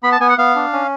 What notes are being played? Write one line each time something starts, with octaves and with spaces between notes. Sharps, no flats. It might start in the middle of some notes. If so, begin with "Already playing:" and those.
B3 B5
A5
B3 G#5
F#5
B3 F5
D4
C#4